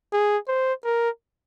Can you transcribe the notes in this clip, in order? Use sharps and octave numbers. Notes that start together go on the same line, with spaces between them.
G#4
C5
A#4